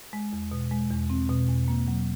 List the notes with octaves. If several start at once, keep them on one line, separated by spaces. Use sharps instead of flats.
G#3
E2
B2
G#3
E2
C4
B2
E2
A#3
F#3